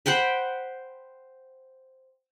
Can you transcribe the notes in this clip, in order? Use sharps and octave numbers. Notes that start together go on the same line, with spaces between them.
C5 F#5 G5 B5